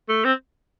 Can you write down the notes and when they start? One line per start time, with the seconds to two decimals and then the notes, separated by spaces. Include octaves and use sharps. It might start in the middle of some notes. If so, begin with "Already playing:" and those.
0.09 A3
0.25 C4